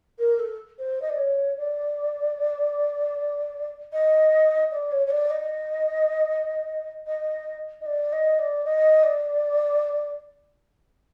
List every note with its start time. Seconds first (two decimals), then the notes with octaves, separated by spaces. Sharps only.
0.19 A#4
0.39 A4
0.79 C5
1.02 D#5
1.10 D5
1.18 C#5
1.57 D5
3.93 D#5
4.71 D5
4.92 C#5
5.07 C#5
5.10 D5
5.30 D#5
7.07 D#5
7.81 D#5
7.86 D5
8.12 D#5
8.39 D5
8.65 D#5
9.03 D5